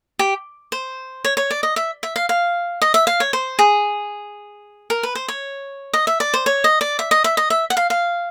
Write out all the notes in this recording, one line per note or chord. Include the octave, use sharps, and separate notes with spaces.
G4
C5
C#5
C#5
D5
D#5
E5
E5
F5
F5
D#5
E5
F5
C#5
C5
G#4
A#4
B4
C5
C#5
D#5
E5
D5
C5
C#5
D#5
D5
E5
D#5
E5
D#5
E5
F#5
F5
F5